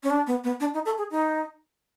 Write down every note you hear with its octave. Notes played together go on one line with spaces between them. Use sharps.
C#4
D4
B3
B3
D4
D#4
A4
G#4
D#4